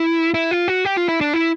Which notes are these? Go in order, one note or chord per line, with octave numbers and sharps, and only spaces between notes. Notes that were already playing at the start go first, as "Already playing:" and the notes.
Already playing: E4
E4
F4
F#4
G4
F4
E4
D4
E4